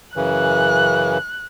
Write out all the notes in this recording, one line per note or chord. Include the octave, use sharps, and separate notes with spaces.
F#2 C#3 E3 F#6